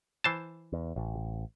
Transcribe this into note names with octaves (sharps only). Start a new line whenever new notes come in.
E3 C5 A5
E2
A1